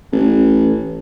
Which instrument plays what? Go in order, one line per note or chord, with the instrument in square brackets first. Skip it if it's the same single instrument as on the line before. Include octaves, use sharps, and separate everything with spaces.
[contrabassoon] A1